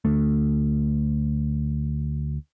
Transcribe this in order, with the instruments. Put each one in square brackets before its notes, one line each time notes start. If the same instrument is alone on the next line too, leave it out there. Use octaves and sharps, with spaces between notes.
[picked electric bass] D2 A3